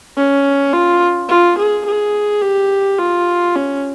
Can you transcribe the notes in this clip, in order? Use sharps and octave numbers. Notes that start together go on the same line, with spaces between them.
C#4
F4
F4
G#4
G#4
G4
F4
C#4